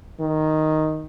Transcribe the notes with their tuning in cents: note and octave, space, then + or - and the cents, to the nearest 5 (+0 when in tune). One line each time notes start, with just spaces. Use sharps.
D#3 +0